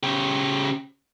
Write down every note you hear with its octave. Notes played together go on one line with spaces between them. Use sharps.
C#3 G4